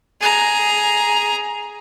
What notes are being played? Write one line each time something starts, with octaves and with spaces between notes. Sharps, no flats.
G#4 A#5